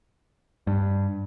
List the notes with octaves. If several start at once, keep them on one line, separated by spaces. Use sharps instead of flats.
G2